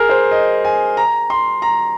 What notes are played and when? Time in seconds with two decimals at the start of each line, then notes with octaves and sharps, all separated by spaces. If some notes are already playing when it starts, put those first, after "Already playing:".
Already playing: G#4 A#4
0.09 C5
0.31 D#5
0.65 G#5
0.97 A#5
1.30 C6
1.62 A#5